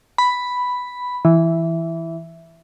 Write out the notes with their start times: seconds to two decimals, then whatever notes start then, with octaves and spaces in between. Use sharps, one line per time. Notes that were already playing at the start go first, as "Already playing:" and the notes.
0.18 B5
1.25 E3